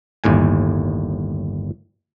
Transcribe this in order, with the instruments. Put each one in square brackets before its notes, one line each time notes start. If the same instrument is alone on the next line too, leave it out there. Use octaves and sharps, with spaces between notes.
[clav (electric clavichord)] G1 D#2 A2 G#5